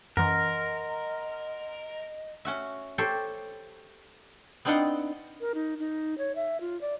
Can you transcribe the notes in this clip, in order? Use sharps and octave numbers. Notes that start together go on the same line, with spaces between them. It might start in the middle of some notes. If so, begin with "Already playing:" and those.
F#2 E3 A#4 D#5 F#5 A#5 C6
C#4 F#4 E5
G4 A4 C5 C#5
B3 C4 D4 D#4 F4 F#5
A#4
D#4
D#4
C#5
E5
F4
D5